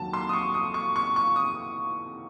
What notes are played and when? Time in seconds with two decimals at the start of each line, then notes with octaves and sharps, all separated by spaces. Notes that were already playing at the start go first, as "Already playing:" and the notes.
Already playing: D#2 D#3 F#3 A5
0.13 C6
0.29 D#6
0.33 C#6
0.54 D#6
0.74 C#6
0.96 C#6
1.16 C#6
1.36 D#6